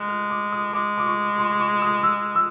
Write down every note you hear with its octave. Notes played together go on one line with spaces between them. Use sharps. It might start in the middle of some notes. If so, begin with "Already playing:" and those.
Already playing: G#3 F#6
F6
D6
D#6
G#3 D6
D6
C#6
C6
C#6
D#6
E6
E6